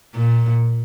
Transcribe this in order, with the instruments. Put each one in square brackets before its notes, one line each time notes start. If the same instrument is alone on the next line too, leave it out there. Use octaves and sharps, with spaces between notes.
[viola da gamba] A#2